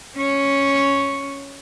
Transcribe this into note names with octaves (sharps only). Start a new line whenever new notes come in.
C#4 C#5